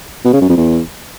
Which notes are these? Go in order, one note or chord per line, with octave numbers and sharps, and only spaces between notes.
B2
C#3
F#2
F2
E2